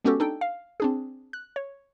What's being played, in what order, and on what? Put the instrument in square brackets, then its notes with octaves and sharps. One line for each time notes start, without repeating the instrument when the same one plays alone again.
[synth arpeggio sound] G#3 B3 C#4 F#4 G4 A4
D4 D#4 A4 G5
F5
C4 D4 G#4
F#6
C#5